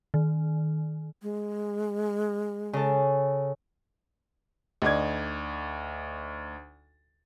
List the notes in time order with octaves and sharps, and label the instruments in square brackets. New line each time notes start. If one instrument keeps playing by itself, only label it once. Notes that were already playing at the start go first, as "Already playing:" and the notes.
[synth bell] D#3
[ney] G#3
[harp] C#3 A4
[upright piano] D2 D#4 D5 G#6